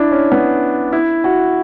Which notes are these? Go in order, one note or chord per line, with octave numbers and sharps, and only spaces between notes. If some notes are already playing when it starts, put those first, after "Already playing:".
Already playing: D4 E4
C#4
B3
E4
F#4